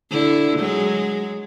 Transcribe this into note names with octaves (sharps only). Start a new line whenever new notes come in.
D3 E4
F#3 G#3